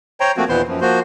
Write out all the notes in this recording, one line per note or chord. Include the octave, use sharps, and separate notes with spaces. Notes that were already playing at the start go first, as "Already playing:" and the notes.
C5 C#5 G5 A#5
F3 A3 A#3 C4 F#4
D#2 A#2 E3 B3 C5 C6
F#2 F3
F3 A#3 F#4 C5